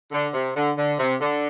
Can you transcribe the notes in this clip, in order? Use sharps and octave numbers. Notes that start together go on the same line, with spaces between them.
D3
C3
D3
D3
C3
D3